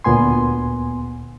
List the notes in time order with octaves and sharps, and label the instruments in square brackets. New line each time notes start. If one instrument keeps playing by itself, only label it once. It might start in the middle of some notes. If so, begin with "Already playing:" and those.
[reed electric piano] D2 A#2 B3 G#5 C6